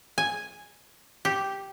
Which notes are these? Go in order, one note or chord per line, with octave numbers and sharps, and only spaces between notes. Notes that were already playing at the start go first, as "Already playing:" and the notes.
G#5
G4